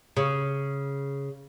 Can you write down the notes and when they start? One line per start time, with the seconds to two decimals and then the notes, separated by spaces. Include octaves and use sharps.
0.17 C#3